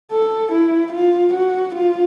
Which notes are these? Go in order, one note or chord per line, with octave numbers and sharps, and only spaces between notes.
A4
E4
F4
F#4
F4